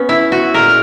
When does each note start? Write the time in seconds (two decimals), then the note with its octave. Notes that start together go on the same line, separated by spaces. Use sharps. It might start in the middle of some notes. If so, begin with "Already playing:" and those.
Already playing: B3 C#4
0.09 E4
0.32 F#4
0.54 A#2 G#3 A#4